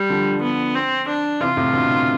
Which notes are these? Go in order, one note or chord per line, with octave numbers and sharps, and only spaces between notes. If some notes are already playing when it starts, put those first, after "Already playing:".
Already playing: G3
D3 F3
B3
C4
D4
C3 E3 F4
A2 C3
B2 D3